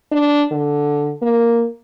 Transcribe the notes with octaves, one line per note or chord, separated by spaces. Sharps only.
D4
D3
A#3